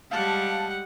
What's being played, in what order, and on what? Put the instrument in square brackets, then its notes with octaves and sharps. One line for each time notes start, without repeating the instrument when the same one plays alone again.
[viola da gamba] G3 G#3 [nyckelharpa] G4 F#5 [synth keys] F5 A5